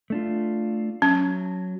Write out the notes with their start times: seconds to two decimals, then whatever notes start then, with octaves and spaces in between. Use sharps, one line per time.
0.10 A3 D4 F4
1.02 F#3 C#4